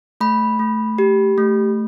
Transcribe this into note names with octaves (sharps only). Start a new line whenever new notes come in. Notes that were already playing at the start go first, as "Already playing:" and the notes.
A3 B5
A3
G4
A3